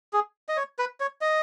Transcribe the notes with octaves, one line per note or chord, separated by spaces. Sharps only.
G#4
D#5
C#5
B4
C#5
D#5